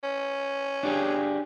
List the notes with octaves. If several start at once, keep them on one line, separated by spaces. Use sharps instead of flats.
C#4
D4 G4 G#4